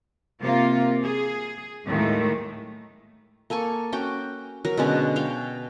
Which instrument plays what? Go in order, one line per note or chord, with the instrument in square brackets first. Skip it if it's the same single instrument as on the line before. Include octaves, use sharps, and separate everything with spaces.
[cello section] C3 A#3 F4
G#4
D#2 A2 D#3 F#3 G#3 A3
[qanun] A#3 A4 G#5 C#6
C#4 F#4 G5
F#3 A#4
B2 D3 G#3 C#4
C#5 F5 G5